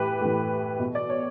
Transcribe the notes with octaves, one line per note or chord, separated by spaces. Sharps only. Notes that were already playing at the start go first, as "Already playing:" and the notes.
Already playing: A2 E3 G4 B4
A2 E3
B2
D5
C#5